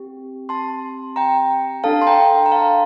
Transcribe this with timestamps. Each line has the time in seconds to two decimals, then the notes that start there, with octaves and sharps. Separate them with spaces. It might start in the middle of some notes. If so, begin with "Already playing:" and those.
Already playing: C4 G4
0.49 A5 C6
1.16 G5 A#5
1.84 D4 A4 F5 A5
2.02 C6
2.07 G5 A#5
2.46 A#5
2.51 F5 A5